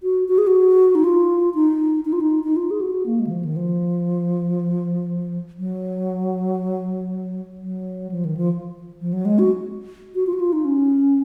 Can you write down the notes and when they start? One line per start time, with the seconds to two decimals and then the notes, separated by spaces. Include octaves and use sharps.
0.03 F#4
0.28 F#4
0.38 G#4
0.47 F#4
0.95 D#4
1.04 F4
1.55 D#4
2.05 D#4
2.13 F4
2.20 D#4
2.44 D#4
2.56 F4
2.71 G#4
2.81 F#4
3.06 A#3
3.20 G#3
3.27 D#3
3.31 F3
3.45 D#3
3.56 F3
5.59 F#3
7.62 F#3
8.11 F3
8.25 D#3
8.37 F3
9.01 F3
9.13 F#3
9.25 G#3
9.39 F#4
10.15 F#4
10.27 F4
10.33 F#4
10.40 F4
10.53 D#4
10.65 C#4